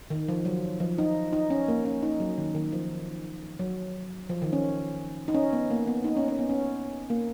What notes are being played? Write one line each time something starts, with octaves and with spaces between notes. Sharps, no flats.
D#3
F3
F#3
F3
D#4
D#4
C#4
A#3
C#4
D#4
F#3
D#3
D#3
F3
F#3
F3
D#3
C#4
D#4
C#4
B3
A#3
B3
D#4
C#4
C#4
B3
C#4
A#3